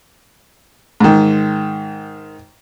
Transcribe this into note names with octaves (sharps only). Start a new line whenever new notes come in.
G#2 D#3